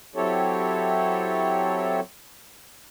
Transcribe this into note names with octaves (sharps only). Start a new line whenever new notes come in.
F#3 C4 E4 G4 A4 C#5